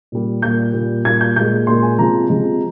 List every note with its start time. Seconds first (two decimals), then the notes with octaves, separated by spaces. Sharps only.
0.12 A#2 G3
0.42 A#2 G3 G6
0.73 A#2 G3
1.04 A#2 G3 G#6
1.21 G6
1.36 A#2 G#3 G6
1.67 A#2 G#3 C6
1.82 G#5
1.99 C3 F3 G#3 A#5
2.29 C3 F3 G#3